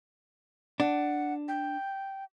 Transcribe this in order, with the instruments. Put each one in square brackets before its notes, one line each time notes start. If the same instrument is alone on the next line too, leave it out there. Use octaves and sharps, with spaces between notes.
[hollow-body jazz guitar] D4 [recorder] F#5
[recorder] G5